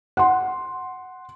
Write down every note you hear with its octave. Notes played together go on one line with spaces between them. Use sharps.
F#5 C6